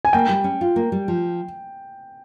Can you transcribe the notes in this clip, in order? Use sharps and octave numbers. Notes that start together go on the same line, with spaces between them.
G#5
A#3 G5
G3
C#4
F4
A#3
G3
F3